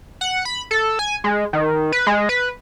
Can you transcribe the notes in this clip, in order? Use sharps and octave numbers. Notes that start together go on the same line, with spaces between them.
F#5
B5
A4
G#5
G#3
D#3
B4
G#3
B4